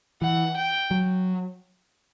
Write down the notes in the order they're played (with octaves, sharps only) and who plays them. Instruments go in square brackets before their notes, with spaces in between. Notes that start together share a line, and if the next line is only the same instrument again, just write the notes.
[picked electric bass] E3 [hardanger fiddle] F#5
[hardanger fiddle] G5
[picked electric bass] F#3